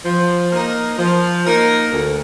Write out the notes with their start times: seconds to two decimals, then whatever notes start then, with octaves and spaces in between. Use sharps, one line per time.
0.05 F3
0.53 A#3 D#4 A#4
0.98 F3
1.46 A#3 D#4 A#4
1.92 D2